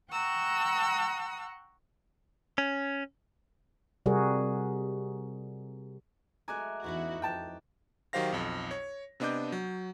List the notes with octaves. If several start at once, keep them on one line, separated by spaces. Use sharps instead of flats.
F#5 G5 A#5 C#6 E6 F#6
C#4
C3 G3 F#4 G#4 A#4
F#3 G#3 A3 G#5 A#5 D6 F#6
E2 E3 C#4 D#4 E4 F#4
F2 G5 A5
D#3 F#3 G4 C5 F5 A#6
B1 F2
C#5
C3 B3 D4 D#5 D6 G6
F#3